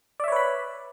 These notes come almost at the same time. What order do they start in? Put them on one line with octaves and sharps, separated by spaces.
D5 E5 C#5 B4 B5